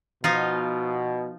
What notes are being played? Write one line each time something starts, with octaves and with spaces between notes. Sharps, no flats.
B2 F3 D#4 F4